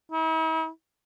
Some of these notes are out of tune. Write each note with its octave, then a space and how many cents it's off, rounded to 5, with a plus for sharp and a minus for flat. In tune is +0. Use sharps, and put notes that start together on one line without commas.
E4 -45